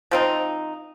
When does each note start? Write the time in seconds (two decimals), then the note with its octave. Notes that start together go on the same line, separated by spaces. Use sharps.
0.11 F3 C4 D#4